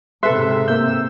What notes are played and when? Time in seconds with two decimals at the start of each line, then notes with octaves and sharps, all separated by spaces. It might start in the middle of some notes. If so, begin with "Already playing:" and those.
0.23 G#2 C3 A4 B4 E5 C6
0.68 A#3 E6 G6